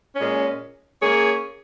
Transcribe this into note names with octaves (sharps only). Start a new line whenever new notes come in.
A#2 G#3 C#4
A#3 C#4 G#4 C#5